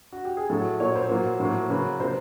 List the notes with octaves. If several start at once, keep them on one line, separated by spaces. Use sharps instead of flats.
F#4
G4
G#4
A2 F#3 A3 A4
A#2 F#3 A#3 C#5
C5
A#2 F#3 A#3
A2 F#3 A#3
C#3 F#3 A#3 B4
C3 F3 A#3 C5